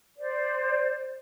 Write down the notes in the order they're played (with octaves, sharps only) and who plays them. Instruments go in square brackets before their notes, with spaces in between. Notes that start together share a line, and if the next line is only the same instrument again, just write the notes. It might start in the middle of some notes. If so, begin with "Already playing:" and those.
[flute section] C5 D5